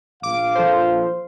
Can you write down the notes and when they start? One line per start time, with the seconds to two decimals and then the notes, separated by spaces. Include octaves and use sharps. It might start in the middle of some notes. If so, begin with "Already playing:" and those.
0.23 A#1 F5 D6
0.55 F3 A4 C5